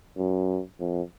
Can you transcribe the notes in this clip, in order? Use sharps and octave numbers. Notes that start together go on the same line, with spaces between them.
F#2
F2